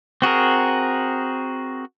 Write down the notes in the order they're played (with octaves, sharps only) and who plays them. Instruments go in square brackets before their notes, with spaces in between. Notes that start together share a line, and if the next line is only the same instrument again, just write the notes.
[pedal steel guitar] C4 F#4 G#4 A#4